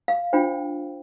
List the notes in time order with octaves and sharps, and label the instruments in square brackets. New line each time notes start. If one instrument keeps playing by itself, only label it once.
[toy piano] F5
D4 F4 C5 G5